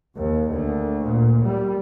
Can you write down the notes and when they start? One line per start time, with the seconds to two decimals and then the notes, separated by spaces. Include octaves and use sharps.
0.16 D#2
0.49 D2
1.03 A#2
1.44 G3